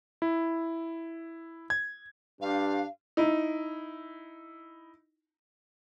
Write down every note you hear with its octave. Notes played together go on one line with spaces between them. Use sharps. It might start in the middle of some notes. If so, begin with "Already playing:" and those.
E4
G#6
G2 D4 G4 F5
D#4 E4